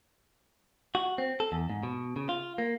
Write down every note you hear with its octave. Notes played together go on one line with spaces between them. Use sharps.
F#4
C4
A4
E2
G#2
B2
C#3
F4
A#3